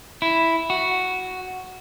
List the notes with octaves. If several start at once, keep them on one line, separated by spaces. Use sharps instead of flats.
E4
F#4